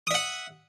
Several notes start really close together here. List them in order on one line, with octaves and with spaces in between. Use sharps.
D#6 E5 F#5